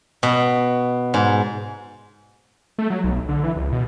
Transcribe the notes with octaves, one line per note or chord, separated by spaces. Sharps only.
B2
G#2
A3
F#3
B1
D3
E3
C#2
B2